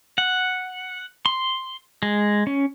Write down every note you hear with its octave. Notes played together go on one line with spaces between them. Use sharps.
F#5
C6
G#3
C#4